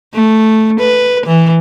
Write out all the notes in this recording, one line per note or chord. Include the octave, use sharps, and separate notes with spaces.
A3
B4
E3